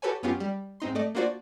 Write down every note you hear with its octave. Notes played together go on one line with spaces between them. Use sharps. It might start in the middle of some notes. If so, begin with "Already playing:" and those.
F#4 G4 A4 B4 C#5 G#5
F#2 B3 C#4 F4 G4
G3
G#2 C4 D#4 C6
A3 D5 D#5
A#3 D4 F4 F#4 C5 D5